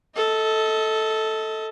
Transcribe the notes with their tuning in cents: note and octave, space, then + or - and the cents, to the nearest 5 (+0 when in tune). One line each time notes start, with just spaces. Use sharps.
A4 +0 D#5 +35